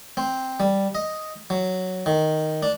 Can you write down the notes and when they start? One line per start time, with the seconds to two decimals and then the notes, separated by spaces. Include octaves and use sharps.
0.17 C4
0.60 G3
0.95 D#5
1.50 F#3
2.06 D#3
2.63 D4